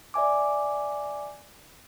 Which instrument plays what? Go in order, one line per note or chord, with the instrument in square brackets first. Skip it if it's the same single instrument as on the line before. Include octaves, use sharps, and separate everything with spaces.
[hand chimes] D5 E5 G#5 D6